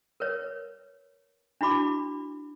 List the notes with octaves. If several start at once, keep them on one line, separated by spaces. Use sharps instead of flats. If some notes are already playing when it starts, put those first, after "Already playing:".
A#4 B4 C#5
D4 E4 F#4 B5 D6